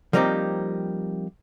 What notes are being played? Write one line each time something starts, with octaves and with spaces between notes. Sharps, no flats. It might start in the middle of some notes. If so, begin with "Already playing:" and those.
F3 G3 A#3 C4 D#4 G4